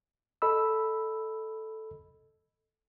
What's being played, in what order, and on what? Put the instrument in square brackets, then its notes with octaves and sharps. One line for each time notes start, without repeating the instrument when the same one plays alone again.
[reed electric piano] A4 D#5 B5 E6